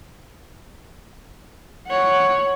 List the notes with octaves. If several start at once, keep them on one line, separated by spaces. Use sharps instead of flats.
C#5 F#5